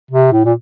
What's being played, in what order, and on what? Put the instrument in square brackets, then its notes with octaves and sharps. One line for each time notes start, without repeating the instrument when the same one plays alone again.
[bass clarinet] C3
A2
A#2